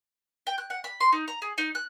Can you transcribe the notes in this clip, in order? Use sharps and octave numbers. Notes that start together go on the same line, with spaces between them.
G5
F#6
F#5
B5
C6
D#4
A#5
G#4
D#4
F#6